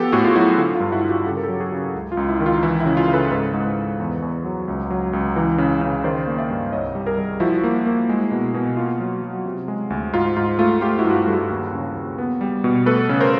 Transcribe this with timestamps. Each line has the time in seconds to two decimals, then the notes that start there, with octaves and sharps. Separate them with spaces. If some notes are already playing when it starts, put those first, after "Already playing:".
Already playing: F3 B3 G4 A4
0.12 A2 F#4 G#4
0.25 F4
0.35 F#3 E4 F#4
0.58 D3 F4
0.75 F4
0.80 G2
0.92 E4 F#4
1.04 G2
1.09 F4 G4
1.26 C#3 G4 A4
1.37 A#4
1.43 G4 A4
1.49 F#3
1.54 G4
1.60 F#4 G#4
1.72 C#3
1.95 C#2
2.12 F4
2.17 C#2
2.29 E4
2.40 D#3
2.46 F4
2.63 E3 E4
2.80 E4
2.86 C#3
2.97 F4
3.08 C#3
3.14 A4 B4
3.31 G#2 A4 B4
3.53 G#2
3.77 G#2
4.00 E2
4.22 E2
4.45 F#3
4.68 C#2
4.90 F#3
5.13 C#2
5.36 E3
5.58 C#3
5.81 C#3
6.04 D#3 C5 D5
6.27 A#3
6.38 D5 E5
6.50 G2
6.72 C2 C#5 D#5
6.95 G3
7.06 G#4 A#4
7.17 G3
7.40 F3 E4 F#4
7.64 A#3
7.86 A#3
8.09 G#3
8.31 B2
8.54 B2
8.77 A#3 F4
9.00 F#3
9.23 F#3
9.46 C3
9.68 G#3
9.90 D2
10.13 G#2 F4
10.36 G#2 F4
10.59 A3 F4
10.81 A3 F4 G4
10.99 E4 F#4
11.04 G2
11.10 F#4
11.16 F4 G4
11.27 G2 A4
11.33 F#4 G#4
11.50 D#2
11.72 C#3
11.95 D#2
12.18 B3
12.41 G3
12.64 B2
12.86 A3 A4 B4
13.09 C#3
13.20 A#4 C5